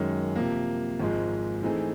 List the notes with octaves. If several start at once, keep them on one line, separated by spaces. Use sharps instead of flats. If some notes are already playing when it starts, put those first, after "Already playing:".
Already playing: F#2 D#3 G#3 C#4
C3 F3 A#3
G#1 G#2 F3 G#3
E3 A3 C4 D#4 G#4